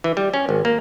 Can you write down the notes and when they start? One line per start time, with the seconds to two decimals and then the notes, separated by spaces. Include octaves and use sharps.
0.04 E3
0.17 G3
0.34 C#4
0.49 G#1
0.65 A#3